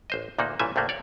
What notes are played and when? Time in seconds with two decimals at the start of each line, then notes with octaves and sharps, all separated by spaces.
0.10 A1 C5 D#5
0.39 D2 A#2 A#3 D#4 F#4
0.59 A1 A#2 E3 G3 E5 G#5
0.76 C2 G2 A3 A#3
0.89 C#5 D5